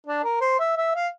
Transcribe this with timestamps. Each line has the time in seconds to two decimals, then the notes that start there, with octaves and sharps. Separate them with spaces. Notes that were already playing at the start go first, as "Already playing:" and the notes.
0.07 D4
0.23 A#4
0.41 C5
0.59 E5
0.77 E5
0.95 F5